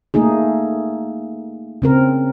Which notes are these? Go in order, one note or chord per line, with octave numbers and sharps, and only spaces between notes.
A3 A#3 D#4 G#4
C#3 C4 A#4